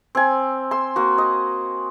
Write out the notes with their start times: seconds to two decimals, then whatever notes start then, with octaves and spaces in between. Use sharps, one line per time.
0.15 C4 G#5
0.71 C6 E6
0.96 A#3 F#4
1.18 D#5